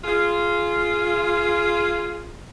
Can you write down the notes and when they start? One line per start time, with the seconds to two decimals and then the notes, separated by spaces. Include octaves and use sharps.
0.04 F4 G#4